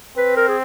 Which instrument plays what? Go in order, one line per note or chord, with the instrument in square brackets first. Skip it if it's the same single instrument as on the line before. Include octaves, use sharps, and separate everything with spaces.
[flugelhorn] C4 [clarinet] B4
[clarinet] A#4
G#4